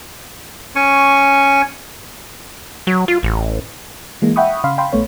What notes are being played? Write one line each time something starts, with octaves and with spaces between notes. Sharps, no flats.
C#4 G#5 C#6
F#3
F4
A1
E3 G#3 A#3
E5 F#5 G5 B5 C#6 D#6
C#3 F5 B5 C6
F5 G5 B5 C6
A#1 A3 B3 C#5